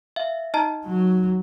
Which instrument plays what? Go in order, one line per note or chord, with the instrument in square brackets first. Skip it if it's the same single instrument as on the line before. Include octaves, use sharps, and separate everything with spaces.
[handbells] E5 F5
[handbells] D#4 [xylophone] D#5 A5 A#5
[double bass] F#3